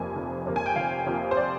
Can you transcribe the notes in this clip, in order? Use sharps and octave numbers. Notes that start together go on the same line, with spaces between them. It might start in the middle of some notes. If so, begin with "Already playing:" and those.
Already playing: F1 F2 C3 F3 A#3 G#5
F1
F2 C3 F3 A#3
G#5
G5
F1 F5
F2 C3 F3 A#3
C5
D5